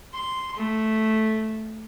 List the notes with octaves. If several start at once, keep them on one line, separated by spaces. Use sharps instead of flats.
C6
A3